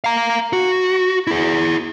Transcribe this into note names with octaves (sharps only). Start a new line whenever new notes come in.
F5 A#5
F#4
E4 G#4